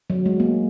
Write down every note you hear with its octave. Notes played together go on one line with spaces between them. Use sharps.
F#3
G#3
A#3